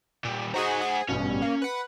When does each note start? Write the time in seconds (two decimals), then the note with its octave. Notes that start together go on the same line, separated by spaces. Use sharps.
0.24 A#2 G3
0.54 D#4 F#4 G#4 C5 F#5
0.81 G#4
1.09 A1 G2 B2 C#4
1.42 A#3
1.62 B4 F#5